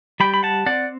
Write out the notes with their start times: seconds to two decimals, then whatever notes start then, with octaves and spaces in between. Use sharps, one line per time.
0.20 G3 G5 B5
0.34 B5
0.43 F#5 A5
0.66 C4 D5 F#5